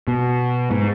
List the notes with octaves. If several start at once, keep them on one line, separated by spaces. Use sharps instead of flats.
B2
G#2